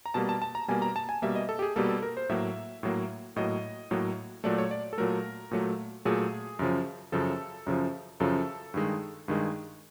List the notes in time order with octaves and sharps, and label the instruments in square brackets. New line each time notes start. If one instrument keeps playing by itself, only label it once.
[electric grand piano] A#5
B2 G3 A#3 A5
A5
A5
A#5
B2 G3 A#3 G#5
A#5
A5
G#5
B2 G3 A#3 E5
D#5
A4
G4
G#4
B2 G3 A#3 A4
A4
A#4
C5
A2 F#3 A#3 E5
A2 F#3 A#3
A2 F#3 A#3 D#5
A2 F#3 A#3
A#2 F#3 A3 D5
C#5
D5
A4
A#2 F#3 A3 A#4
A#2 F#3 A3
A#2 F#3 A3 G#4
F#2 C#3 F3
F#2 C#3 F3 A4
F#2 C#3 F3
F#2 C#3 F3 A4
G2 D#3 G#3
G2 D#3 G#3